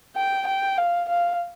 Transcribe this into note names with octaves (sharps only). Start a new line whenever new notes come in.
G5
G5
F5
F5